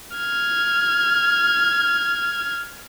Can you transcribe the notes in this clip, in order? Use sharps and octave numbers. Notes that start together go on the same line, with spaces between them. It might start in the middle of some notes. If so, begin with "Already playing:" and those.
F6 G#6